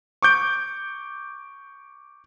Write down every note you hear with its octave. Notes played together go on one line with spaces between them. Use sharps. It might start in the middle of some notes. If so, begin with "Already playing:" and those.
C#6 D6 G6 D7